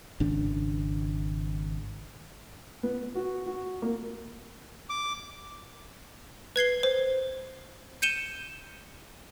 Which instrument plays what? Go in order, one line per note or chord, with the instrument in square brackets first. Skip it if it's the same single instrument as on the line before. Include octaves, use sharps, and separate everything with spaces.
[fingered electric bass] G#1 C#3 D4
[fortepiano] B3
F#4
F#4
A#3
[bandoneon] D6
[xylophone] B4 G#6 C7 G7
C5
G6 C#7 D#7 E7 G7